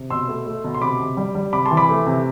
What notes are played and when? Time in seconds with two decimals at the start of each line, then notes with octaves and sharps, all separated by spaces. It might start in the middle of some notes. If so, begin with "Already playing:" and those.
Already playing: C3
0.10 B2 C6 E6
0.28 A3
0.46 A3
0.64 B2
0.75 C6
0.81 C3 B5 D6
1.00 C3
1.17 G3
1.35 G3
1.53 C3 B5 D6
1.65 A5 C6
1.71 E3
1.77 B5 D6
1.89 A3
2.07 C3